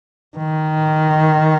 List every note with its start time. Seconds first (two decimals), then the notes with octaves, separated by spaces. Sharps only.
0.37 D#3